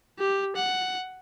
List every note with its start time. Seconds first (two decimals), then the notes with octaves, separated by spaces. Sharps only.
0.19 G4
0.56 F#5